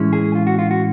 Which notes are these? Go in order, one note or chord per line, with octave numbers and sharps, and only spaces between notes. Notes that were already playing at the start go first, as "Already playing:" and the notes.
Already playing: A2 E3 G#3 C#4 E4
G#4
F4
F#4
F4
F#4